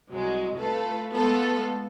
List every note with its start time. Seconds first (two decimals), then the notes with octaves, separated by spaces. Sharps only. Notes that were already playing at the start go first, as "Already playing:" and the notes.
0.11 C2 F#3 G#3
0.58 A3 F4 A4 B4
1.13 G#3 A3 B3 F4 A4